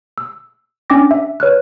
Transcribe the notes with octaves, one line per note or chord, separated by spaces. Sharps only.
E6
C#4 D4 G5 D6 A#6
E5
B4 C#5 F6 F#6